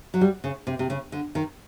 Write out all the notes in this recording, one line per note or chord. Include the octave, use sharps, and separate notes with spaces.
F#3
G3
C#3
C3
C3
C#3
D3
D#3